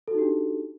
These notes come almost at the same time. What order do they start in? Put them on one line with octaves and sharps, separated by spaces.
A4 F#4 D#4 G4 D4